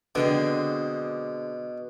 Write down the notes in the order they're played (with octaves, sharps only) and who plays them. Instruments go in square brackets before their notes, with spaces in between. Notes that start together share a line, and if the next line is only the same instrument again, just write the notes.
[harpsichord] B2 [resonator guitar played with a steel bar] D3 G#3 C4